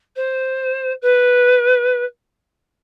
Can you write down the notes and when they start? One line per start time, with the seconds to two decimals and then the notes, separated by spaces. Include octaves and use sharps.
0.16 C5
1.02 B4